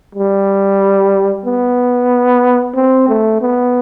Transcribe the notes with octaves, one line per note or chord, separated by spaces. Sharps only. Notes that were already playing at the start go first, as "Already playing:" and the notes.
G3
B3
C4
A3
B3